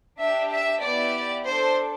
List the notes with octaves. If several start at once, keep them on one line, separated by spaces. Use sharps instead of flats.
D4 G4 E5
E5
B3 E4 G4 D5
D4 A4 C5